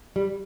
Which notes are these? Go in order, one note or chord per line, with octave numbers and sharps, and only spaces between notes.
G3